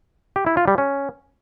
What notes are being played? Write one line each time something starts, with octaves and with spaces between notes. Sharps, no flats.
G4
E4
F4
G3
C#4